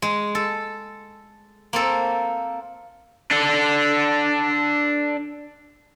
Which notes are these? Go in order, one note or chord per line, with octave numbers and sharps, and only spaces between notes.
G#3
A4
A#3 C4 A4
D4 A4